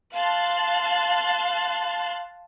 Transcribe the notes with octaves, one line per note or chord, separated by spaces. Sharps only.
F5 A5 C6 F#6